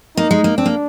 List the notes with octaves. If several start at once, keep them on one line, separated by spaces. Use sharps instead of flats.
A#3 D#4
G#3
A#3
C4 D4
A#3